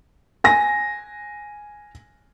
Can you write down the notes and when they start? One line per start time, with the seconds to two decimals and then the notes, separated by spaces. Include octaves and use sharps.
0.44 G#5 A#6